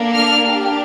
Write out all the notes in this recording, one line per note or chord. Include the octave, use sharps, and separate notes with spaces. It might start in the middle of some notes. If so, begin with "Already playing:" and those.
Already playing: A#3 D4 A4
F6
D4 G4